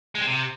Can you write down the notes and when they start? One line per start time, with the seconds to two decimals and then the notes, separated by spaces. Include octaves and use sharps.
0.15 G#3
0.21 C4
0.27 C3